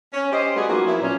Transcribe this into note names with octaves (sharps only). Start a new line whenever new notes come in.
C#4
G4 C5 D#5
G3 A3 B3 C#4 F#4 G#4
F#3 A#3 D#4 F4 F#4
F3 F#3 A#3 B3 E4
A#2 C#4